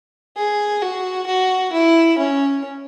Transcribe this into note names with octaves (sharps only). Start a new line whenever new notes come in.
G#4
F#4
F#4
E4
C#4